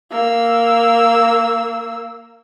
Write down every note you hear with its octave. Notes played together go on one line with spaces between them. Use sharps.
A#3 E6